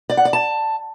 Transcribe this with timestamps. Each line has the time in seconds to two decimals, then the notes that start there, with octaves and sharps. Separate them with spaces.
0.10 D5
0.17 F#5
0.25 D5
0.33 A5